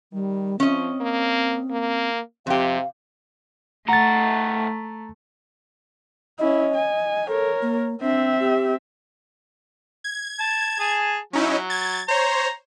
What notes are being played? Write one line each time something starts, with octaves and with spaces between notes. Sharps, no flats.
D#3 G3
F3 C4 C#4 D#5
A#3
A#3
F2 C3 G4 F5
A2 A3 F#5 A#5 A6
C#4 E4 D#5
G#5
A4 A#4 C#5
A#3
C4 D4 E5
G4
G#6
A5
G#4 G#5 A5
F#3 C#4 D#4 E4
G#6 A6
C5 C#5 A#5